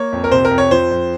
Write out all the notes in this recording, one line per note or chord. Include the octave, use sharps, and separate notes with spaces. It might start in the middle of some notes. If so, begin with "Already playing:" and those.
Already playing: A#3 C#5
F2
A#4
C3 C5
A#4
F2
C#5
F3 C5
F2